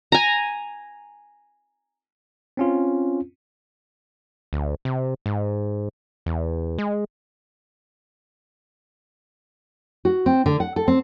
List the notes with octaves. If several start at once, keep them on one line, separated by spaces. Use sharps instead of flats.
G#5 A#5
C4 C#4 F4
D2
C3
G#2
E2
G#3
F#4
C4
D3
F#5
A4
C4